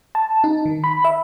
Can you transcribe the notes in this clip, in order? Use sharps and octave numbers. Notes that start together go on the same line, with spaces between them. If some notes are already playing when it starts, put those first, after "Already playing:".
A5
D#4
D#3
B5
E5